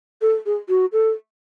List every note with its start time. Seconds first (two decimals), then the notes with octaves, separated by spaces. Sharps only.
0.22 A4
0.46 G#4
0.69 F#4
0.92 A4